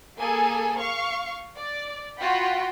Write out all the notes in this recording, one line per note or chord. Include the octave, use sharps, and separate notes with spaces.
A#3 G#4 A4 G#5
F5 C#6
D5
F4 F#4 F#5 G5 B5